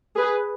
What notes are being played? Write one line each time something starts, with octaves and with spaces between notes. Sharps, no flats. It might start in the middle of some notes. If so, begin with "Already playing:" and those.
G#4 B4